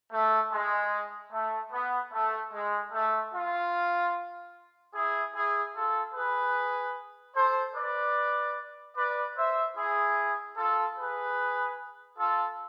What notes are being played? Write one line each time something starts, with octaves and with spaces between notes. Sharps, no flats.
A3
G#3
A3
B3
A3
G#3
A3
F4
E4 G#4
E4 G#4
F4 A4
G#4 B4
A4 C5
B4 D5
B4 D5
C5 E5
E4 G#4
F4 A4
G#4 B4
F4 A4